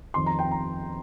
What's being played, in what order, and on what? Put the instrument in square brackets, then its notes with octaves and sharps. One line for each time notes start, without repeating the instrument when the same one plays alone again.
[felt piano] F2 D#3 C6
A#5
G5
A#5